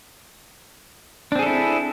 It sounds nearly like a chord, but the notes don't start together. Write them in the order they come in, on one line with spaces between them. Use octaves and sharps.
D4 C4 G#4 A4 E4